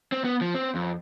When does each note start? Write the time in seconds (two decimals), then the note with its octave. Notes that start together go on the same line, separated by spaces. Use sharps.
0.12 C4
0.25 B3
0.41 F3
0.55 C4
0.75 F2